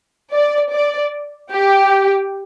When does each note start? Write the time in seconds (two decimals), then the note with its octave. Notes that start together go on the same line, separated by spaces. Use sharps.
0.31 D5
0.71 D5
1.52 G4